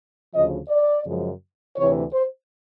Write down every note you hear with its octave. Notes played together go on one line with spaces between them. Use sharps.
D2 C#3 F3 D#5
D5
F#2 C#3 F3 G#3
D2 C3 E3 C#5
C5